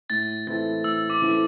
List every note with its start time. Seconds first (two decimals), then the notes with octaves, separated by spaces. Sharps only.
0.10 A2 A6
0.47 E3 C4 E4 A4 A6
0.84 A2 E6
1.10 D6
1.22 E3 C4 E4 A4